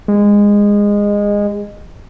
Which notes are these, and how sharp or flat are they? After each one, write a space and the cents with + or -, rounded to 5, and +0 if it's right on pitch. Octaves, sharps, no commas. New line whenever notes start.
G#3 -20